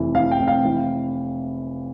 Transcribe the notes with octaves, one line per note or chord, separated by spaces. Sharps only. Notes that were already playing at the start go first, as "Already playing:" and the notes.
Already playing: F1 E3
E3 F5
G5
F1
F5
E3